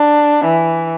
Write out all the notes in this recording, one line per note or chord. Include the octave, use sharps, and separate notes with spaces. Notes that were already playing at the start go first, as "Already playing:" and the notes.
Already playing: D4
E3